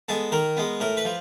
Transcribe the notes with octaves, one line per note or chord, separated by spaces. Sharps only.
G#3 B3 A4
D#3 A#4
G#3 B3
A2 A#4
B4
F3